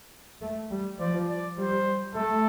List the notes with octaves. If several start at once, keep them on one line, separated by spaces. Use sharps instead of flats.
A3
G3
F3 D5
D5
G3 C5
A3 A4